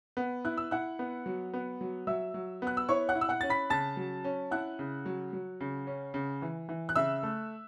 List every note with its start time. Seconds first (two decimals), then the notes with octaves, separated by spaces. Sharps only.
0.17 B3
0.45 E4 F#6
0.57 E6
0.71 E4 F#5 F#6
0.99 B3
1.26 F#3
1.53 B3
1.81 F#3
2.07 F#3 E5 E6
2.34 F#3
2.62 B3 F#6
2.77 E6
2.89 E4 C#5 C#6
3.09 F#5 F#6
3.15 E4
3.21 E6
3.29 F#5 F#6
3.41 C#4 A6
3.50 B5 B6
3.70 C#3 A5 A6
3.97 F#3
4.25 C#4
4.51 E4 F#5 F#6
4.79 C#3
5.06 F#3
5.33 F#3
5.60 C#3
5.87 C#4
6.14 C#3
6.42 E3
6.69 E3
6.89 F#6
6.96 C#3 E5 E6
7.23 A3